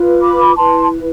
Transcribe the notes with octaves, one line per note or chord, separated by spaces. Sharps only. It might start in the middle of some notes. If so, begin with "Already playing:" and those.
Already playing: F4 B4
B5 D6
E4 B4 A5 C6